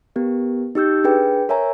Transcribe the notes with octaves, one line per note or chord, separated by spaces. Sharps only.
B3 G4 A#4
D#4 G4 E6 G6
D4 G#4 B4 G5
A#4 C#5 E5 G#5 A#5